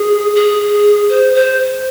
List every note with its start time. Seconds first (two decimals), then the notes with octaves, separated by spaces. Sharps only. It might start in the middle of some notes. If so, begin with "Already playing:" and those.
Already playing: G#4
0.35 G#4
1.09 C5
1.34 C5